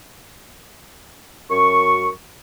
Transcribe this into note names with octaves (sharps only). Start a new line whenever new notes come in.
F#2 C#6